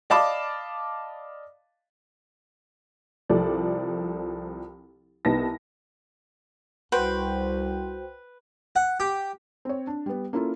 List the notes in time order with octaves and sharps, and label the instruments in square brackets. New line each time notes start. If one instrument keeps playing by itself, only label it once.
[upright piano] D5 D#5 F5 A5 B5 D6
[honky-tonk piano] C2 F3 A4 D5
C2 B3 D#4 A5 A#6
[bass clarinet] C2 [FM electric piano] F#4 C5 G5 [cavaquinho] B4
[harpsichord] F#5
G4
[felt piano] C4 C#5
D4
G3 B3
A#3 C#4 E4 F4 A4